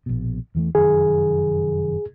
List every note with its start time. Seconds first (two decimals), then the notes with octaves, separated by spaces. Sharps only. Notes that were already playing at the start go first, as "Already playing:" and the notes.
0.06 A#1 B2
0.55 E2 E3 A3
0.75 F1 F#2 D#3 G#4